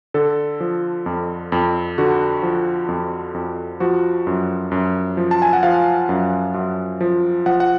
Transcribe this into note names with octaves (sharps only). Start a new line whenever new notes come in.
D3 A4
F3
F2
F2
D3 F#4
F3
F2
F2
F3 F#4
F#2
F#2
F3
A5
G#5
F#5
F3 F5
F#2
F#2
F3
F3 F#5
F#5